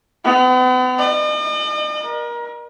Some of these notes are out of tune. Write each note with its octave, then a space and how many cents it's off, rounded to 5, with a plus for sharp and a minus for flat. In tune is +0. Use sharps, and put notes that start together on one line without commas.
B3 +45
D#5 -45
A#4 +30